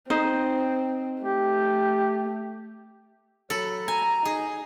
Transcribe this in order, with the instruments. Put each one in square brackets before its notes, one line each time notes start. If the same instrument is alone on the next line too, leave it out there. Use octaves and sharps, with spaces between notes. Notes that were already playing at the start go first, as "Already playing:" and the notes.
[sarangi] C4 [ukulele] D#4 C5 D#5
[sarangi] A3 [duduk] G4
[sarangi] F#3 [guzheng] A4 B5
[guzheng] G#5 [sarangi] A#5
[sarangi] D#4 [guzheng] G#4